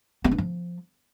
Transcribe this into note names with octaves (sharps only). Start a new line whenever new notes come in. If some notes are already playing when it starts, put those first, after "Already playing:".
B3
D4
F3